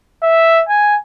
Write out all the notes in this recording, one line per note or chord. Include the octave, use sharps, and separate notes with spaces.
E5
G#5